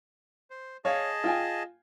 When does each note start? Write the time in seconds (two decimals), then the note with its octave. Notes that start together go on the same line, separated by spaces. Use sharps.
0.50 C5
0.85 G#4 C#5 D#5 F5 A5
1.24 F4 G5 G#5